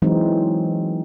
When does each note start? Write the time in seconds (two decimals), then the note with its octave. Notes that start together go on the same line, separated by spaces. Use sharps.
0.02 E3 F#3 G#3 C4 D#4